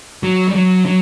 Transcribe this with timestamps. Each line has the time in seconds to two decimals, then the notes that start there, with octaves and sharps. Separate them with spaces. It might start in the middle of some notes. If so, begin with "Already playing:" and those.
0.23 F#3
0.49 G3
0.55 F#3
0.86 F#3